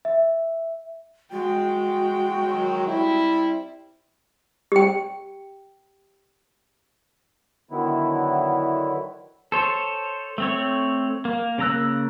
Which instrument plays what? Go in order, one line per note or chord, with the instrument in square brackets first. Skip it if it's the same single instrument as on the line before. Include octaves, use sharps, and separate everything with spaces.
[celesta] E5
[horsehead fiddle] G#3 G5 [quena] F#4
[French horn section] D#3 F#3
G3 C4 E4
[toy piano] G4 G5
[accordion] D3 D#3 F#3 B3 E4
[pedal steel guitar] A4 C5 C#5
A3 C4 C#5
A#3
C#3 A#3 A#5 E6 F#6